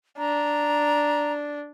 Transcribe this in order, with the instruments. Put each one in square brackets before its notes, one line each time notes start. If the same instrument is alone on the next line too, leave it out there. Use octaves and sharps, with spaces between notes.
[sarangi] D4 [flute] A#5